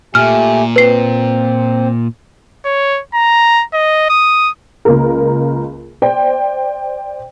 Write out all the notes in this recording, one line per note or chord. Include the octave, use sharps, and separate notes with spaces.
A#2 A3 G4 G#5 F6
C4 B4 C7
C#5
A#5
D#5
D#6
C#2 A#3 A#4
C5 D5 G5